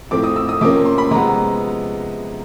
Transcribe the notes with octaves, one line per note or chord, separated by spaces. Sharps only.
A2 F3 A3 C4 D6
D#6
E6
D#6
C3 F3 A#3 C#4 D6
C6
B5
C3 F3 G#3 B3 A#5